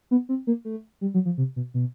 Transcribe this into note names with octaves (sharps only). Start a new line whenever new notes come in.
B3
C4
A#3
A3
G3
F#3
F3
C3
B2
B2